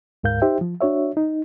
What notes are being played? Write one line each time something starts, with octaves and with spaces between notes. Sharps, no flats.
D2 G#2 A#4 F5 G6
D#4 G4 C5 E5 G5
F3
D4 F#4 C#5 E5
D#4